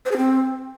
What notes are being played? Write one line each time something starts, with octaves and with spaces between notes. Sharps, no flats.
C5
G#4
C4